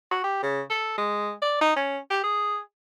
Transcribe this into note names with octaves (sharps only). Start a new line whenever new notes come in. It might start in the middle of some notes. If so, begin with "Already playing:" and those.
F#4
G4
C#3
A4
G#3
D5
D#4
C#4
G4
G#4